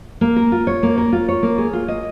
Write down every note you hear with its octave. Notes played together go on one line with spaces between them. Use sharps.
A#3
A#4
F4
C#5
A#3
A#4
F4
C#5
A#3
G#4
F4
D#5